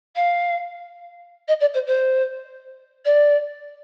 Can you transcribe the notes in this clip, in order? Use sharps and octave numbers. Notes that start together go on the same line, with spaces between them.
F5
D#5
D5
C5
C5
D5